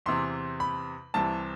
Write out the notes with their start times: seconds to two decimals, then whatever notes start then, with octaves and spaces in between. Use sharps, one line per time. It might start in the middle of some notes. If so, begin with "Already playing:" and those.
0.06 E2 C3 E3 C6
0.60 B5
1.14 C2 C3 E3 A5